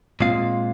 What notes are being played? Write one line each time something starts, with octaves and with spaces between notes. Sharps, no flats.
A#2 G#3 C4 F4 F5